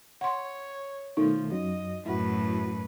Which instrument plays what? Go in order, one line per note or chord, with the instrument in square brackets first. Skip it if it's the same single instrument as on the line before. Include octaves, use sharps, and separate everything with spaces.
[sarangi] C#5 [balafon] F#5 C6
[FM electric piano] B2 D#3 A3 [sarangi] F3 [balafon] D#4
[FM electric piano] F#2 F#3 [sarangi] D#5
[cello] F#2 A2 [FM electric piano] E4 F#4 [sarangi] B4